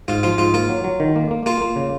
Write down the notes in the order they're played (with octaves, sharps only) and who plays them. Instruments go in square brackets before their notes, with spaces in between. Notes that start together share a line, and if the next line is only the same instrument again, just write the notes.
[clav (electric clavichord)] G#2 [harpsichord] F4
[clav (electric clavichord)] F3 [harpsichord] F4
[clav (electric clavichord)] G#2 [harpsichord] F4
[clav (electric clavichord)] A#3 [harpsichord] F4
[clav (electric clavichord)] F#3
F#3
D#3
A#3
A#3
[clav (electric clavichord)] A#3 [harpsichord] F4
[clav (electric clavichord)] A#3
C#3